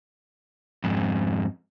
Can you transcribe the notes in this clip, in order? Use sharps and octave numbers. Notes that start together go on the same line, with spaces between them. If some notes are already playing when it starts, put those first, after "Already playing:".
F2 G#2